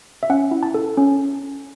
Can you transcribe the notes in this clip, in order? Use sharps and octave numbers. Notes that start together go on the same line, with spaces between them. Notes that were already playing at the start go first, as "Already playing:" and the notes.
E5
C#4 F#5
E4
A5
A4
C#4